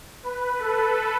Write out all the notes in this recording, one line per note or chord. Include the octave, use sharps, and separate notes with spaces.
B4
A4